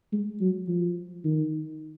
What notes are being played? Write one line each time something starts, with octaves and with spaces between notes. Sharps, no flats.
G#3
F#3
F3
D#3